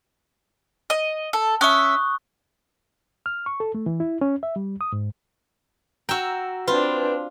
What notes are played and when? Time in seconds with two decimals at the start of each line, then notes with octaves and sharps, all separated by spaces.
0.90 D#5
1.33 A4
1.61 C#4 E5 C#6 D#6 F#6
3.26 F6
3.46 C#6
3.60 A4
3.75 A3
3.86 E3
4.00 E4
4.21 C#4
4.43 E5
4.56 G3
4.81 D#6
4.92 G#2
6.09 F#4 G5 A#5 E6
6.68 C4 D4 F4 B4